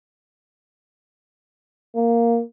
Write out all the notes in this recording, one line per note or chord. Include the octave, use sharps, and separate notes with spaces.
A#3